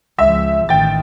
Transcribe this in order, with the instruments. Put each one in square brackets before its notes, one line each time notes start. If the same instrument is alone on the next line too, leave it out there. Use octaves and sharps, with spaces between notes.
[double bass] C#2 F3 [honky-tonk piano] E5
[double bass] A1 D#3 [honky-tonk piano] G5 A6